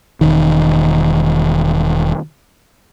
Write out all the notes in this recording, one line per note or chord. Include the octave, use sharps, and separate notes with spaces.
E1 D#3